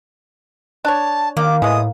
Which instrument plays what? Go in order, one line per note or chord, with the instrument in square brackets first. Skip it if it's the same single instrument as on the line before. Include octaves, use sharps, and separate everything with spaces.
[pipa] D4 C#5 [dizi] A5
[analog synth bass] D#3 [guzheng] A#3 [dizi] D6
[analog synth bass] A2 [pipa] E3 G#3 [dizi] D#6